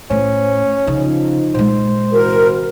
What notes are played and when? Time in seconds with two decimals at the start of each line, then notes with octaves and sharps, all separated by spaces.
0.10 A2 C#4 C5
0.87 C#3 F3 D#4
1.55 A#2 G#3 C5
2.12 C3 E3 F#4 A#4